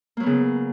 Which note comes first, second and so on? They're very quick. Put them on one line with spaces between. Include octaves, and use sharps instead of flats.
A#3 F#3 B3 C#3